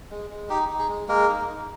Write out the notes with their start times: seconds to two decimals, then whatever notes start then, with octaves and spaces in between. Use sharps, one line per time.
0.11 G#3
0.30 G#3
0.50 D#4 G4
0.69 D#4
0.78 G#4
0.88 G#3
1.08 G#3 A#3 A#4
1.28 D#4
1.47 D#4